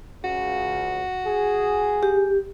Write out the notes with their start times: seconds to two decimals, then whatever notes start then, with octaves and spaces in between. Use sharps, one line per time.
0.24 C#2 C#3 F#4
1.26 G#4
2.03 G4